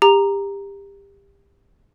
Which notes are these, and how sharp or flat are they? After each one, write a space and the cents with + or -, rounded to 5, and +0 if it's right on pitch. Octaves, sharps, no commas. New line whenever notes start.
G4 +25 A#5 +0